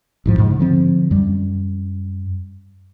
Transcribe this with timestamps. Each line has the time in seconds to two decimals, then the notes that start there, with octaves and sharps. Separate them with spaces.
0.26 A1 G#2 F3
0.38 G#2 C#3
0.59 D3 F3 C4
1.11 F#2 G3